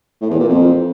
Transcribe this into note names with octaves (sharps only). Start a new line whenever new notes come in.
A2
E2
A#2
F2